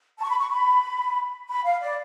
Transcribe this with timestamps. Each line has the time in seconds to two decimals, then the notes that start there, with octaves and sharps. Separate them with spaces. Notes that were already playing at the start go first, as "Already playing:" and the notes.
0.19 A5
0.23 C#6
0.29 B5
0.39 C#6
0.50 B5
1.49 B5
1.66 F5
1.82 D5